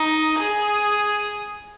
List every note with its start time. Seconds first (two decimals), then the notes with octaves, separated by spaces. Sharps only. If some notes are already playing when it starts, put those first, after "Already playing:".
Already playing: D#4
0.38 G#4